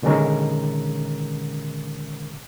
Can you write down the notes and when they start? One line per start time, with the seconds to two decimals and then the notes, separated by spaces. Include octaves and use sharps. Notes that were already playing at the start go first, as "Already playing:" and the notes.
0.02 A#2 D3 D#3 G#3 C#4 A#4